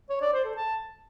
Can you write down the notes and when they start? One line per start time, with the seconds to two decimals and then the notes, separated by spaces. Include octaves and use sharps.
0.10 C#5
0.21 D5
0.33 C5
0.45 A4
0.56 A5